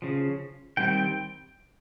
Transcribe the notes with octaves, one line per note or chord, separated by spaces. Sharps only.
C#3 F3
D#3 G3 C4 G5
G5